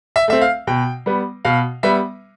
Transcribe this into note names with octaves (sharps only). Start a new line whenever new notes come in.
E5
A3 C4 E5
F5
B2 G5
G3 B3
B2 F5
G3 B3 E5